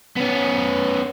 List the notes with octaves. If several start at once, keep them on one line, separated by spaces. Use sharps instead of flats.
B3 C#4